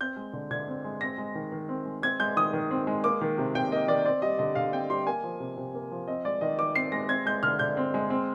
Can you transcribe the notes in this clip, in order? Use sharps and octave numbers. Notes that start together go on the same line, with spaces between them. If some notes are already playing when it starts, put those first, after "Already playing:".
C4 G6
G#3
D3
D3 G#6
C4
G#3
C4 A#6
G#3
D#3
D#3
C4
G#3
C4 G#6
G#3 G6
D#3 D#6
D#3
C4
G#3
A#3 D6
D#3
C3
C3 G5
A#3 D#5
D#3 D5
C4 D5
G3 D#5
D3 D#5
D3 F5
C4 G5
G3 C6
A#3 G#5
F3
C3
C3
A#3
F3
C4 D#5
G#3 D5
D#3 D#5
D#3 D6
C4 C7
G#3 A#6
C4 G#6
G#3 G6
D3 F6
D3 G6
C4
G#3
C4